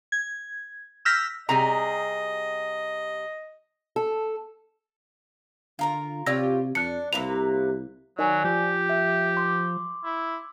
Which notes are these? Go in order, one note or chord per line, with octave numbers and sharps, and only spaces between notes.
G#6
E6 F6 G6 A#6 B6
C3 G3 G#4 D#5 A#5
A4
D3 F4 A#4 A#5
C3 F4 G4 C#5 D5 E6 A#6
F2 D4 F#6 C#7
C2 C3 A#3 B4 F7
D#3 F#3 D5 G#5
F3 G4
E5
C6 D6
E4